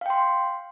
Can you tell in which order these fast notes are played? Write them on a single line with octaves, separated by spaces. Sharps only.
F5 G5 C6